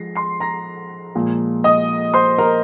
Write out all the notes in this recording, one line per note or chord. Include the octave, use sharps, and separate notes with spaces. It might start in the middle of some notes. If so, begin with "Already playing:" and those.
Already playing: F3 G#3 A#6 C7
C6 C7
A#5 A#6
A#2 F3 G#3
D#5 D#6
C5 C6
A#4 A#5